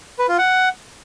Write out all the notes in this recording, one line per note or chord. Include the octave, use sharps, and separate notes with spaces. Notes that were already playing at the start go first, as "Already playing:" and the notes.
B4
F4
F#5